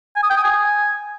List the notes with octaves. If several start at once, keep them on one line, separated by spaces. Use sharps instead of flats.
G#5
D#6
G5
D#6
G#5